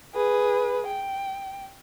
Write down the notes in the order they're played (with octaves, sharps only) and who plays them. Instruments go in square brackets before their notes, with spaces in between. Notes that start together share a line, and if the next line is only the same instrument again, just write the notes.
[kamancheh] G#4 B4
G5